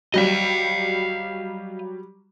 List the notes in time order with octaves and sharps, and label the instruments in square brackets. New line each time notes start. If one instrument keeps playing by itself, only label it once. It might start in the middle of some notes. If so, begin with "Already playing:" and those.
[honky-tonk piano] F#3 G3 [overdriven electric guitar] D#5 F5